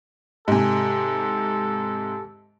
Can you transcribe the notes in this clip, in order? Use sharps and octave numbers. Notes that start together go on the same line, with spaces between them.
G#2 C3 G4 A4 G#5